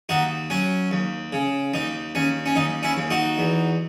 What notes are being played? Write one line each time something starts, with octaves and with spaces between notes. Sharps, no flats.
D#2 D#4 F#4
F#3 C#4
D#2
C#3
D#2 D#4
D#2 C#4
C#4
D#2 D#4
C#4 E4
D#2
D#4 F#4
E2